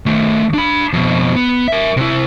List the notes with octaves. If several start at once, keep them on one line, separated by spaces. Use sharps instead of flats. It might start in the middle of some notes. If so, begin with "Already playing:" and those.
D#3 A3
D4 B5
F2 B2
B3
A#4 E5
C3 E4